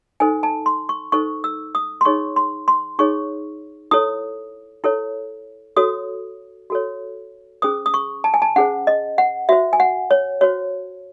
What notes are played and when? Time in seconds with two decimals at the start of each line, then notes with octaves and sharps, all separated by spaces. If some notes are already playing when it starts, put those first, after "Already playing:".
0.20 D#4 A4 C5 G#5
0.43 A5
0.66 C6
0.89 C#6
1.12 D#4 A4 C5 C#6
1.44 E6
1.75 D#6
2.01 C6
2.05 D#4 G#4 C#5 C#6
2.36 C6
2.68 C6
2.99 D#4 G#4 C#5 C#6
3.91 E4 A4 C#5 D#6
4.84 E4 A4 C#5
5.77 F#4 A4 C#5 D#6
6.70 F#4 A4 C#5
7.62 C#4 G#4 C5 D#6
7.86 D#6
7.94 C#6
8.24 A5
8.34 G#5
8.42 A5
8.56 C#4 G#4 C5 F#5
8.87 D#5
9.18 F#5
9.49 F#4 C5 E5
9.73 G#5
9.80 F#5
10.11 C#5
10.41 F#4 C5 C#5